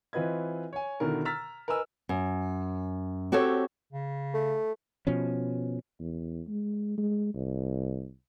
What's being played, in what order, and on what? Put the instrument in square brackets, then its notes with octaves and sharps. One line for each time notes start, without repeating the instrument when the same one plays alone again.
[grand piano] E3 C4 F4 B4 D#5 G#6
C#5 G#5
B2 D3 D#3 E4 A#4
A#5 E6 F6 A6 B6
A#4 B4 D#5 G#5 E6
[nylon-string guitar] F#2
C4 F#4 G4 A4 C#5
[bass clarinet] C#3
[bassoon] A3
[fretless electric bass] B2 F3 C#4
[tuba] E2
G#3
G#3
C2